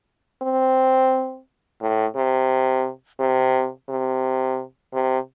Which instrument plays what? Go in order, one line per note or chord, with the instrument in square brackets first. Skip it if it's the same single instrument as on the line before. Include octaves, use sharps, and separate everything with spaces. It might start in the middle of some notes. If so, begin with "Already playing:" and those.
[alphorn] C4
A2
C3
C3
C3
C3